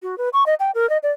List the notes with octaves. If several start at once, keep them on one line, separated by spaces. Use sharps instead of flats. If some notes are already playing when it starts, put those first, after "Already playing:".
F#4
B4
C#6
D#5
G5
A#4
D#5
D5